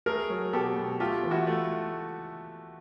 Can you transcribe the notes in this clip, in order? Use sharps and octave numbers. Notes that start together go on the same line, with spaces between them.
A3 G#4 A#4
F#3
B2 G4 A4
B2
A3 F4 G4
E3
E4 F#4
A3